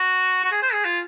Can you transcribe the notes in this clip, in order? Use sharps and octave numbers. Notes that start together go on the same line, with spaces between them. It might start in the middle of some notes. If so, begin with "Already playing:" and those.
Already playing: F#4
F#4
G#4
C5
G#4
F4